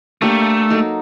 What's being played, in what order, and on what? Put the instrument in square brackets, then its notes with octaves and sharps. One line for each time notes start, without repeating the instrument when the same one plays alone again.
[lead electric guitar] A3 [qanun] A#3 D4 G4
[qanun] F#3 A#3 D#4 A4